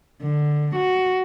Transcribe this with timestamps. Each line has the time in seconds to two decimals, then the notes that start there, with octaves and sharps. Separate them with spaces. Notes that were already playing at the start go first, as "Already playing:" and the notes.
0.23 D3
0.77 F#4